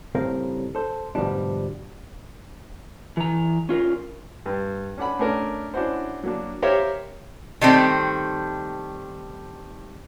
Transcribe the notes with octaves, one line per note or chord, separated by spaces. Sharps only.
A2 C#3 G3 C4 A#4 F5
A4 C5
D2 G#2 B2 F3 G3 D4
E3 A#5
C#4 F4 A#4
G2
C#4 D4 F#5 B5
A3 C#4 D4 A#4
C#4 D4 E4 F#4 C5
F#3 A#3 D4
G4 A#4 C5 C#5 E5 F5
D#3 G3 A3 C4